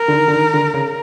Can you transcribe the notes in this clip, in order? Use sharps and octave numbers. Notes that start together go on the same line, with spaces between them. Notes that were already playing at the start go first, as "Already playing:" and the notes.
Already playing: A#4
D3
D#3
D3
D#3
D3
C#3